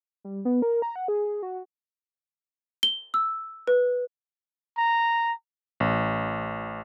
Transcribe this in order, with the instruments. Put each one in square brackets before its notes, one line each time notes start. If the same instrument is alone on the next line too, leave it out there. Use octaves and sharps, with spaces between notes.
[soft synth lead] G3
B3
A#4
A#5
F#5
G#4
G#4
F#4
[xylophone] G7
E6
B4
[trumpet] A#5
[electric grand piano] A1